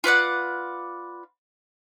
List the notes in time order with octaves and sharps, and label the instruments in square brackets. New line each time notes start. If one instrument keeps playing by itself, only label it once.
[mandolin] F4 B4 D5 F#5